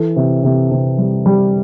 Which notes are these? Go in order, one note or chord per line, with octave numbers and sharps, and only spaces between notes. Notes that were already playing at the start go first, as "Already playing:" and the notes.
Already playing: E3 A4
C3
C3
C3
G3
G3